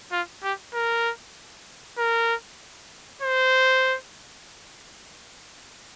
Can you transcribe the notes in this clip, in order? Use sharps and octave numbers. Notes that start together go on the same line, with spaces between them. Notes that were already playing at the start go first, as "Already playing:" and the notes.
F4
G4
A#4
A#4
C5